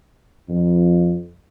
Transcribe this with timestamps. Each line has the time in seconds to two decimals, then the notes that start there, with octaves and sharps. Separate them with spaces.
0.49 F2